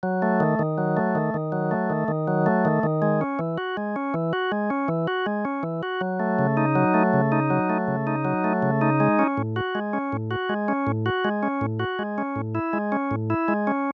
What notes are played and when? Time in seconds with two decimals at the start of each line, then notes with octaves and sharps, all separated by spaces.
0.03 F#3
0.22 A3
0.40 D#3
0.59 D#3
0.78 F#3
0.97 A3
1.15 D#3
1.34 D#3
1.52 F#3
1.71 A3
1.90 D#3
2.08 D#3
2.28 F#3
2.46 A3
2.65 D#3
2.83 D#3
3.02 G#3
3.21 C#4
3.39 E3
3.58 F#4
3.77 G#3
3.96 C#4
4.14 E3
4.33 F#4
4.52 G#3
4.70 C#4
4.88 E3
5.08 F#4
5.26 G#3
5.45 C#4
5.63 E3
5.83 F#4
6.01 F#3
6.20 A3
6.39 C#3
6.57 D#4
6.75 F#3
6.94 A3
7.13 C#3
7.32 D#4
7.50 F#3
7.70 A3
7.88 C#3
8.07 D#4
8.25 F#3
8.44 A3
8.62 C#3
8.81 D#4
9.00 G#3
9.19 C#4
9.37 A2
9.56 F#4
9.75 G#3
9.93 C#4
10.12 A2
10.31 F#4
10.49 G#3
10.68 C#4
10.87 A2
11.06 F#4
11.25 G#3
11.43 C#4
11.61 A2
11.80 F#4
11.99 G#3
12.18 C#4
12.36 A2
12.55 E4
12.73 G#3
12.92 C#4
13.11 A2
13.30 E4
13.48 G#3
13.67 C#4